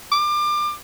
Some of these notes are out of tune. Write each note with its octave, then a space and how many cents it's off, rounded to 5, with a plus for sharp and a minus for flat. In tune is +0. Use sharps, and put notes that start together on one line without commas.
D6 +25